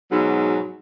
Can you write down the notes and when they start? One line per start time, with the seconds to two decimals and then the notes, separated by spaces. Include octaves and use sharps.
0.11 G#2 B2 F#3